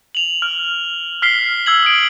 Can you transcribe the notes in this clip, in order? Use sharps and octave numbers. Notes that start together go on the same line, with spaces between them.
F7 F#7
F6
F6 B6 C7 G7
E6 G#6 F#7
D#6 D7